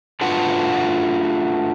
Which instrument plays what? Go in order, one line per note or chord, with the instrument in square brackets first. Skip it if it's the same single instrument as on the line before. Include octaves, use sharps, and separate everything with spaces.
[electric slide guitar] A3 D4 F4 F#4 B4 F#5